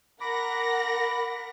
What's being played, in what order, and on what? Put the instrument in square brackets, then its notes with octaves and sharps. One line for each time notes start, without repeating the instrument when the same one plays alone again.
[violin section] A#4 F#5 A#6 [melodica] B5 D6